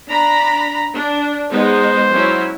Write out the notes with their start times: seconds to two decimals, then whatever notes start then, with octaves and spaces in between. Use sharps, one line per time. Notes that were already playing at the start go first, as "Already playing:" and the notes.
0.11 D4 A#5 B5
0.95 D4
1.50 G#3 B3 D#4 C5
2.11 F#3 C#4 E4